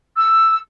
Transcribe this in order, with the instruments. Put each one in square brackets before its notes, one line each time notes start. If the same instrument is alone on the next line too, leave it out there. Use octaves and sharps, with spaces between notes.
[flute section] E6